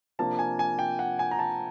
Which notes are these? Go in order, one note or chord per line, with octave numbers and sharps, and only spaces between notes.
C3 F3 A#3 D4 A5
G#5
G#5
G5
F#5
G#5
A#5
A5